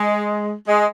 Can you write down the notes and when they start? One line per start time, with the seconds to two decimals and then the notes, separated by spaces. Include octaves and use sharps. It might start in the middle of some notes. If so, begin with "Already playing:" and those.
Already playing: G#3
0.68 G#3